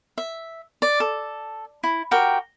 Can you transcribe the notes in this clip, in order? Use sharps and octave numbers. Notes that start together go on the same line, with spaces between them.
E5
D5
A4
E4
F#4 G4 A#4 G5